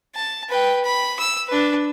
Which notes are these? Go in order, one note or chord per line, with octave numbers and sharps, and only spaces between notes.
A5
B4 G5
B5
E6
D4 B4